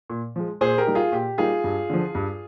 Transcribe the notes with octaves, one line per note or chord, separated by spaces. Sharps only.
A#2
F3 G#3
A#2 G#4 C5
G4 A#4
G3 A#3 D#4
F4 G#4
A#2 G4
G3 A#3 D#4 F4 G#4
G2
D3 F3
G2